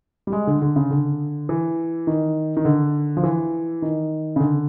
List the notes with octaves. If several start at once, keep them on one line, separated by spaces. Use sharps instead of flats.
G3
G#3
D3
D3
C#3
D3
E3
D#3
D#3
D3
F3
E3
D#3
C#3
D3